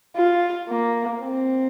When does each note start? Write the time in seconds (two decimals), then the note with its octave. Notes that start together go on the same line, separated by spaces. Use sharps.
0.16 F4
0.69 A#3
1.22 C4